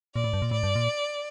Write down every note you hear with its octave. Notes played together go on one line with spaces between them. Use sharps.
A#2 D5
A2
G2
A#2
A2 D5
G2
A#2